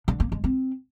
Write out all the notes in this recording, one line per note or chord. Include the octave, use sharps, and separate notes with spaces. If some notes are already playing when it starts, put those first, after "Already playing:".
D3
A#3
G#3
C4